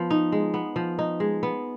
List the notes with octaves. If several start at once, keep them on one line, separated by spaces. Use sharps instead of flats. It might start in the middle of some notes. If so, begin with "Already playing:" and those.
Already playing: F3 B3
D#4
G#3
B3
F3
D#4
G#3
B3